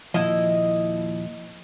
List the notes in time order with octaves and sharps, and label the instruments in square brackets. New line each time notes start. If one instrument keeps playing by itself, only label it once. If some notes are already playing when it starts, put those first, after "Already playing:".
[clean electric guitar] D#2 A#2 F3 [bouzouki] E4 D#5